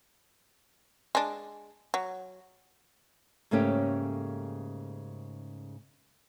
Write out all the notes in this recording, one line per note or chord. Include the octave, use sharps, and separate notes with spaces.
G#3 D4
F#3
G#2 C#3 A3 A#3 C#4 G4